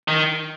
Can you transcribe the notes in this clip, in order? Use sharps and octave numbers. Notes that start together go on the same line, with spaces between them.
D#3